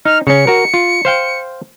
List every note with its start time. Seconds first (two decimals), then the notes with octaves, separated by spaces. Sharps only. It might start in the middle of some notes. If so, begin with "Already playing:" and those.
0.05 D#4 F6
0.27 C#3 C#4 C#7
0.47 F#4 A#4
0.74 F4
1.05 C5 F5 G5